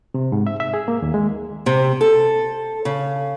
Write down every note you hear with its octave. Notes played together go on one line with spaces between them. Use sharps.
C3
G#2
E5
E5
G#4
A#3
D#2
G#3
C3
A4
C#3